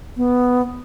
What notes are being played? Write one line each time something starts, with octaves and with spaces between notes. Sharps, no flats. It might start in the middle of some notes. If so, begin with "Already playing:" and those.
B3